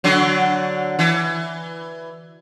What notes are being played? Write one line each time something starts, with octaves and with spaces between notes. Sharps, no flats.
D3 F#3 D4
E3